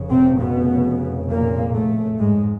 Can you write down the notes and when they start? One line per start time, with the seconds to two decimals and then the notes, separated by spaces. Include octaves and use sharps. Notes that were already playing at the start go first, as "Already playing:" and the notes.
Already playing: F1 F2 C#3
0.11 C3 C4
0.41 B2 B3
1.31 A#2 A#3
1.75 A2 A3
2.20 G#2 G#3